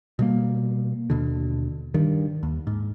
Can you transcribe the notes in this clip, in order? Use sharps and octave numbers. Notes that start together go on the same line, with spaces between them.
B2 G3 A#3
D#2 B2 D3
G2 D#3
D#2
G#2